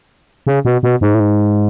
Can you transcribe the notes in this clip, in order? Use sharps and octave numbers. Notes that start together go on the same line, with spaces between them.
C#3
B2
B2
G#2
A2
G#2